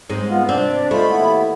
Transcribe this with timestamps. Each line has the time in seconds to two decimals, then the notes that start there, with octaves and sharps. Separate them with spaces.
0.09 G#2 G#3 C4
0.29 B3 F4
0.49 C3 C4 D4 D5
0.91 G#3 A3 F4 C5 B5
1.08 D#2 B3 E4